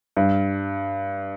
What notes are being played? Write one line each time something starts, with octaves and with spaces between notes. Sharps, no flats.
G2